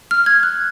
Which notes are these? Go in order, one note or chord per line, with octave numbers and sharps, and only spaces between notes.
F6
G#6
F#6